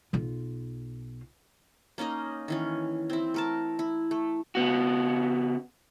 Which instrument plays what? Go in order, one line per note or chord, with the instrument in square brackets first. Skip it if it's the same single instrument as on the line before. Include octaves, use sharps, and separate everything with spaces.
[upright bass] B1 F4
[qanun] A#3 C#4 D#4 D#5
D#3 E3 C#4
C4 E4
A3 A#4 A5
E4
A3
[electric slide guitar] C#3 B3 F#4